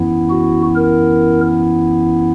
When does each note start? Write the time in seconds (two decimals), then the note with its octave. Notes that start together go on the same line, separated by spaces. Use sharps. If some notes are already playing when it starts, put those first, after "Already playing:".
Already playing: F#2 E3 B3 E4
0.30 F#4
0.76 A#4